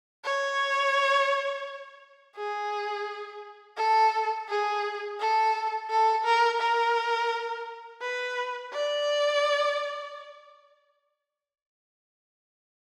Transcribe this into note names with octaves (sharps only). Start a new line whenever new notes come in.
C#5
G#4
A4
G#4
A4
A4
A#4
A#4
B4
D5